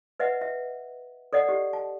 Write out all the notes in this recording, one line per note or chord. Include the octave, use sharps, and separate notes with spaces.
B4 D#5 E5 F#5
E5
A4 D5 D#5 F#5
G4
A5